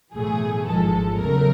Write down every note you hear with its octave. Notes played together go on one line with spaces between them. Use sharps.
B1 A2 E3 A3 G#4
G#1 G#2 F3 G#3 A4
E2 C#3 F#3 A3 A#4